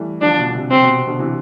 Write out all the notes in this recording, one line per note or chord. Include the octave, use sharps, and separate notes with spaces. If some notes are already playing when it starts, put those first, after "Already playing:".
Already playing: E3 G3 A3
D3 F3 D4
B2
D3
C3
C3 C4
B2
C3
B2 D3
C3 E3